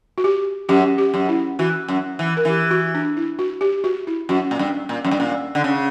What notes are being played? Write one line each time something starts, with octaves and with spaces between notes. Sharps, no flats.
F#4
G4
F#2 G4
G4
F#2
E4
E3 F#4
F#2
E3
A#4
E3 G4
F#4
D4
E4
F#4
G4
F#4
E4
F#2 F#4
A#2
G2
A#2
F#2
G2
A#2
D3
C#3